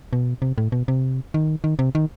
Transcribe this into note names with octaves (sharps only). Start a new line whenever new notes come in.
B2
C3
A2
B2
C3
D#3
D#3
C3
D#3